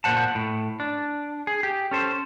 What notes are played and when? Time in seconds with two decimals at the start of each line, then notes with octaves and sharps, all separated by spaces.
0.04 A#2 E3 C5 F#5 A5
0.35 A2
0.80 D4
1.47 G#4
1.63 G4
1.91 C#4 A4 C5